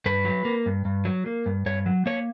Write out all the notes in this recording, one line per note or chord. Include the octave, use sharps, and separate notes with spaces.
G2 B4
F#3
A#3
G2
G2
F#3
A#3
G2
G2 C#5
F#3
A#3 C#5